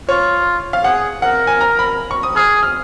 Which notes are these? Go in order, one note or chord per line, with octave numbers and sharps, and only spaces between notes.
F4 C#5
F5
G#4 F#5
A#4 F#5
G#5
A#5
B5
C#6
D#6
G#4 F6
F6